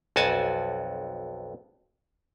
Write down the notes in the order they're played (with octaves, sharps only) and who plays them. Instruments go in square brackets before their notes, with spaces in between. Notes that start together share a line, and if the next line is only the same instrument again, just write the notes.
[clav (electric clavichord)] B1 F2 F#4 G#5 A5